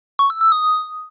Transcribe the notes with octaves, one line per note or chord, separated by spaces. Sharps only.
C#6
E6
E6
D#6